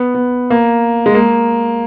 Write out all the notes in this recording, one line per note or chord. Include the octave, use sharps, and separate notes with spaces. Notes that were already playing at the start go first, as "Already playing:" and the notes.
Already playing: B3
B3
A#3
G#3
A#3